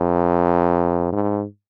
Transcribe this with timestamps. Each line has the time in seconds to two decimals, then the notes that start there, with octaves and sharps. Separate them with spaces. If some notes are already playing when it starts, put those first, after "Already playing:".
Already playing: F2
1.13 G#2